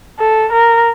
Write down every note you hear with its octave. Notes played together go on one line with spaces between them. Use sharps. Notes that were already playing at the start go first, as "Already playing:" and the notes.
A4
A#4